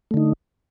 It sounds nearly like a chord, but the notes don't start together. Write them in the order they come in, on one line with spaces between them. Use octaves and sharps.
A3 D3 D#4